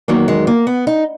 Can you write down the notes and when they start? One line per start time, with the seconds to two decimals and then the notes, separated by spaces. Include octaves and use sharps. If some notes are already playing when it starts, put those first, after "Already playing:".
0.08 E2 D#3 F#3 A#3
0.28 G#3
0.47 A#3
0.67 B3
0.87 D#4